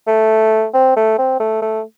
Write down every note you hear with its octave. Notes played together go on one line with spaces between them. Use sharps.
A3
C4
A3
C4
A3
A3